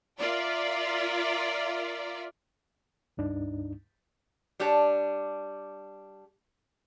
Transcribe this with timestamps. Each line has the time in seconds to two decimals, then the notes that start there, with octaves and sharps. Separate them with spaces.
0.18 F4 A#4 D5 E5
3.17 C#2 G2 D4 D#4
4.60 G3 D4 G4 C#5 A5